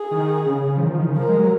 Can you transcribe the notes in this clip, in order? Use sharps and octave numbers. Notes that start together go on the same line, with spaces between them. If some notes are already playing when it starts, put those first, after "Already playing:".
Already playing: G#4
D#3
C#3
C#3
F3
D#3
F3
D#3
C#3
F3 A#4
G#3
F#3